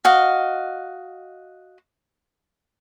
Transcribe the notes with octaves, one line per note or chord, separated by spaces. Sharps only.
F#4 D#5 F5